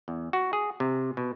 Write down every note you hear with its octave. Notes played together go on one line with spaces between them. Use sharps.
E2
F#4
G#4
C3
B2